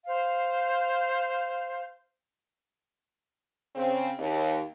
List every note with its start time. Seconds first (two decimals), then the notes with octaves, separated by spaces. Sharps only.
0.05 C5 F5
3.76 C#3 C4
4.19 D#2